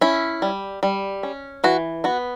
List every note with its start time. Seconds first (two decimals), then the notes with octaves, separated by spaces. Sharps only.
0.01 C#4 E4
0.42 G3
0.83 G3
1.23 C#4
1.64 E3 F#4
2.04 B3 F#4